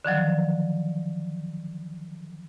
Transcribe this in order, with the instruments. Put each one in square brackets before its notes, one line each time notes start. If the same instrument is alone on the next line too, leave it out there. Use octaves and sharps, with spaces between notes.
[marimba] D3 D#3 F3 F#3